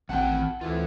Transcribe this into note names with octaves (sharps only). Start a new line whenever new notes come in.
A1 D#3 C4 F#5 G5 A5
D2 E3 F4 A4